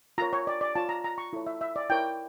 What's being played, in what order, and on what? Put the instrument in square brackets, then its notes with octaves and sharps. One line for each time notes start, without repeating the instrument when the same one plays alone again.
[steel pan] F4 A#4 C#5 A#5
C#5
D5
D5
F4 C#5 A5
A#5
A#5
C#6
E4 A4 C#5
E5
E5
D5
E4 A#4 C#5 G5